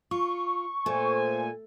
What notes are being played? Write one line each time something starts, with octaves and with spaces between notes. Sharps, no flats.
F4 C#6
A#2 A3 C5 G#5